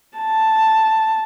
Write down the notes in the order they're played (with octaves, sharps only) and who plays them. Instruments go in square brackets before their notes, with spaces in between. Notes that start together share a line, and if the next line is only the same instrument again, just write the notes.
[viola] A5